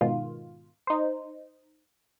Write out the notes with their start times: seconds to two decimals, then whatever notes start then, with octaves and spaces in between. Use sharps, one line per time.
0.01 G#2 B2 D#3 F4
0.87 D#4 C5